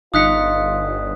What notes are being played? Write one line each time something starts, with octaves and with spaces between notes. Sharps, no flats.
G1 D#4 F4 D#6 F#6 B6 C#7